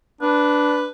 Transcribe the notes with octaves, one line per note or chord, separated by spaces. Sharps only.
D4 B4